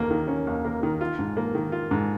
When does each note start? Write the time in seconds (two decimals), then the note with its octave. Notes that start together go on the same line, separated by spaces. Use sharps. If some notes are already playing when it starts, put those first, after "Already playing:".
Already playing: D#2 A#3
0.11 D#3
0.28 C#4
0.47 D#2
0.65 A#3
0.83 D#3
1.01 F4
1.19 G#2
1.37 A#3
1.55 D#3
1.72 F4
1.91 G#2